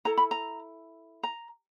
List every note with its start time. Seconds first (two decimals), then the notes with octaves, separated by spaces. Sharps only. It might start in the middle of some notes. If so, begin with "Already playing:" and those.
0.05 E4 A4 A#5
0.17 B5
0.31 A#5
1.23 A#5